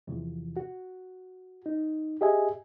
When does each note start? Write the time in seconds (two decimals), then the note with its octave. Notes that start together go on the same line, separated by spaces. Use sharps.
0.07 E2 C3 E3 F3
0.57 F#4
1.66 D#4
2.21 G4 G#4 D#5 E5 G#5